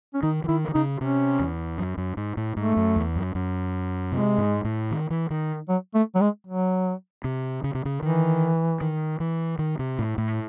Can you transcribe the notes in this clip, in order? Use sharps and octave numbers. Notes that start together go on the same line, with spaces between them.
C#4
D#3 D#4
E3
D#3 E4
D#3
C#3 D#4
C3 C#4
E2
F#2
F#2
G#2
A2
G#2 A3
F#2
E2
F#2
F#2
C3 G#3
G#2
A2
D#3
E3
D#3
F#3
A3
F#3
G#3
F#3
C3
C#3
C3
C#3
D#3 E3
D#3
E3
D#3
C3
A2
A2